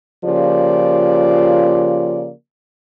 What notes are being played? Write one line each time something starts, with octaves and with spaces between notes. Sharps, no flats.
C#3 F3 A#3 F4 G4 D5